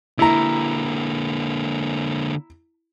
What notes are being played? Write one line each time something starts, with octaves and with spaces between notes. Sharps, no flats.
D3 A#3 E4 A#5